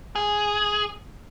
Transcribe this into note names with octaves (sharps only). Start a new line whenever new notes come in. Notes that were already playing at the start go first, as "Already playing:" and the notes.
G#4